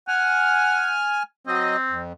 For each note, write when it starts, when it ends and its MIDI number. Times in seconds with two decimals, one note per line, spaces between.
0.08 0.96 78
0.08 1.23 80
0.08 1.23 89
1.47 1.76 54
1.47 2.02 60
1.47 1.76 75
1.89 2.13 41